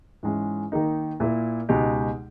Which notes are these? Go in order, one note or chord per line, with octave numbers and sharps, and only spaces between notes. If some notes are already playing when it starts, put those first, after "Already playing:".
G#2 E3 G#3 C#4
D#3 A#3 D#4
A#2 A#3 E4
C#2 B2 G#3 D#4 G4